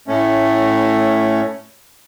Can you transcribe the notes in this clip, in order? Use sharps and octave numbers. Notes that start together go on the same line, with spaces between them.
A2 A3 C#4